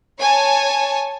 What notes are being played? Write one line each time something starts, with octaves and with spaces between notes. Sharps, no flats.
C#5 G#5 A5